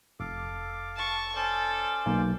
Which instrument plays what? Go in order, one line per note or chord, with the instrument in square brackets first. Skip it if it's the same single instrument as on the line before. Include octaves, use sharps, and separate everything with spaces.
[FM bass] F1 [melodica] A4 F5 D6
[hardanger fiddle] A5 C#6
[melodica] C#4 C5 D5 [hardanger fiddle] A4
[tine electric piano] B1 [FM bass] A#3